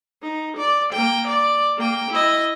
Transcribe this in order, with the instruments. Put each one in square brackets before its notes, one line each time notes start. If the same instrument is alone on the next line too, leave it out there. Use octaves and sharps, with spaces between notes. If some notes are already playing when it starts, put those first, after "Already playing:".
[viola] D#4
D5
A#3 G5
D5
A#3 G5
E4 D#5